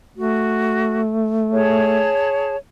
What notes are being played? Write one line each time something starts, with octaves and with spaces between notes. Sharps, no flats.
A3 F#4
G#4 C#5 A5